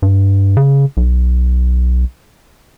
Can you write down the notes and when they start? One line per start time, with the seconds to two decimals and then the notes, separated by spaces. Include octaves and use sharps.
0.02 G2
0.57 C#3
0.97 B1